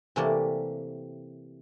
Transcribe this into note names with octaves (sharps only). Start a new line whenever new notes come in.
C3 E3 A3 A#3 G4 D5